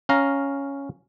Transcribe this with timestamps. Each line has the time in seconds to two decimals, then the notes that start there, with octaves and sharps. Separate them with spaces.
0.09 C#4 F5 A#5